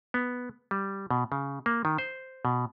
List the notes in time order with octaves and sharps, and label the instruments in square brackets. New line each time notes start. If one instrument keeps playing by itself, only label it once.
[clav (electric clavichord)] B3
G3
B2
C#3
A#3
D#3
C5
B2